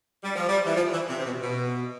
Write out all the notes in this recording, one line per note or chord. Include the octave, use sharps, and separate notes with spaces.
G3
F3
G3
E3
F3
E3
C3
C3
B2
B2